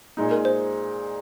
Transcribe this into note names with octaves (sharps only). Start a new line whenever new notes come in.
A#2 G#3 D#4
A#4
C5